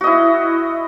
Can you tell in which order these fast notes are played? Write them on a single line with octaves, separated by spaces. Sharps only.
F#4 D#5 E4